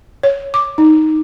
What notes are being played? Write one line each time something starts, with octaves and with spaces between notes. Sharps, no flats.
C#5
D6
D#4